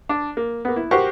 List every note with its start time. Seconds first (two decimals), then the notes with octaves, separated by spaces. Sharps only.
0.09 D4
0.37 A#3
0.65 A#3 B3
0.76 E4
0.91 F#4 G4 A#4 C5 C#6